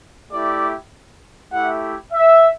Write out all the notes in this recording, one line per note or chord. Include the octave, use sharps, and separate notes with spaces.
A3 E4 G4 D5
A3 E4 G4 F#5
E5